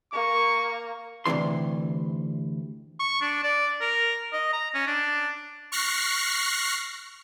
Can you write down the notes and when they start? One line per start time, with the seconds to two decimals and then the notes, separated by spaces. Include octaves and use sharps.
0.13 A#3 C#6
1.26 D2 G#2 C3 E3 C6
3.00 C#6
3.21 D4
3.43 D5
3.81 A#4
4.33 D#5
4.53 A#5
4.74 C#4
4.87 D4
5.72 C#6 F6 F#6 A#6 C7